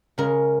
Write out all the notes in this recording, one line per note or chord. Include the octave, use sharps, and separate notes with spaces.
C#3 G#3 A#4